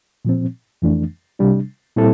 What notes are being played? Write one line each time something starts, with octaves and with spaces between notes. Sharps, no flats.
A#2 F3 C4
F2 E3 A3 D4
C3 G3 D4
A#2 G3 C4 E4 A4